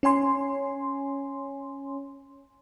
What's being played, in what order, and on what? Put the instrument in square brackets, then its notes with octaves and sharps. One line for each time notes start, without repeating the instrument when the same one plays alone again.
[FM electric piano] C#4 C#5 G#5 C6